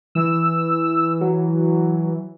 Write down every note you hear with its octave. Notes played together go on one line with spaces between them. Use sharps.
E3 E6
F#3